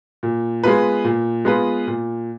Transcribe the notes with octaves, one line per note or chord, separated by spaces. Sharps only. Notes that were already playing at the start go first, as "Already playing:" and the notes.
A#2
G#3 B3 F4 B4
A#2
G#3 B3 F4 B4
A#2